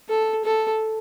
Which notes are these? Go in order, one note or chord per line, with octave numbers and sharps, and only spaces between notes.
A4
A4